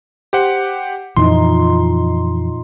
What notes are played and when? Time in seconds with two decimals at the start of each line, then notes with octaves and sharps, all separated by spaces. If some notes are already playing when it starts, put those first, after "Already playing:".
0.33 G4 C5 F#5
1.17 F2 A#2 E3 D#4 C6